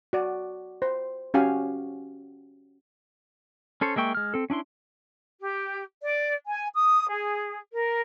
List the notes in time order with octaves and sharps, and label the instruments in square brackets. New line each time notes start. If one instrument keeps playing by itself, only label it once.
[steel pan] F#4 D5
C5
C#4 F#4 G4 F5 G#5
[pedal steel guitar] C#4 A4 C5 C#5
G#3 A#3 E5 G5 C#6
G#3 F6
C4 A4
C#4 D4 E4 C6
[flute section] G4
D5
G#5
D#6
G#4
A#4